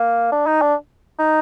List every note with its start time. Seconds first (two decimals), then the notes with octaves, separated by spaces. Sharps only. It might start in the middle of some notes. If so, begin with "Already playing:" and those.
Already playing: A#3
0.32 D4
0.47 D#4
0.62 D4
1.19 D#4